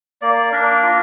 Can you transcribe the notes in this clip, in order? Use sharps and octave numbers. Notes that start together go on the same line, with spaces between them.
A#3 D5
D4 A#4
F4